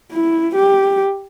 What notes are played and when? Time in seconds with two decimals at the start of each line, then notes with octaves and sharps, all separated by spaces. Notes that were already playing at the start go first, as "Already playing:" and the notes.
0.12 E4
0.55 G4